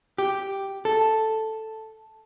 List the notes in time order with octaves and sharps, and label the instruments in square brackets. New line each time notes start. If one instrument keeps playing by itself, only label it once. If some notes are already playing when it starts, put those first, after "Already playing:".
[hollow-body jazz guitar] G4
A4